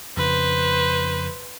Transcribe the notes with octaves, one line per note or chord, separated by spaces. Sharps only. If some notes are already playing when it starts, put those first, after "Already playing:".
F2 C#3 B4 C5